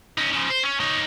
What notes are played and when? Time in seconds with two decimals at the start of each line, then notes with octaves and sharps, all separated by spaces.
0.18 C#4 D#4
0.33 C#3 F3
0.50 C5
0.63 C#4
0.80 D#4 C#5